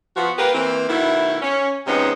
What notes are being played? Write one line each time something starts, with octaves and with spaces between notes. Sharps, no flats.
F3 B3 F#4
A#3 G4 A#4 B4
E3 A#3 C4
B2 D#3 A3 E4
C#4
G#2 C3 F3 B3 C#4 D#4